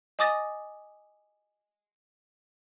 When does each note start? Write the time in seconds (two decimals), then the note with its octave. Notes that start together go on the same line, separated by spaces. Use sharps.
0.19 D#5 G#5 D6 D#6 A6 A#6